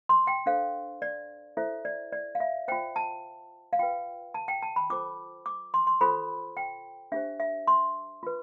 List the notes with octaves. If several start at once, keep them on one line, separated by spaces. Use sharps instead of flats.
C6
G5
D4 A4 C5 F5
D5
E4 A4 C5 E5
D5
D5
F5
E5
F4 C5 G5
A5
F5
F4 B4 G5
A5
G5
A5
B5
F4 A4 C5 D6
D6
C6
C6
F4 A4 C5 B5
G5
D4 G4 C5 E5
E5
C6
F4 B4